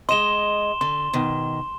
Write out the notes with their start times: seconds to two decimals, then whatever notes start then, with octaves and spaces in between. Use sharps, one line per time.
0.09 G#3 D#5 C6 E7 G7
0.81 D3 C6
1.13 B2 D#3